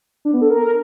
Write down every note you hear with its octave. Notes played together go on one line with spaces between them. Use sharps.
D4
B3
A4
A#4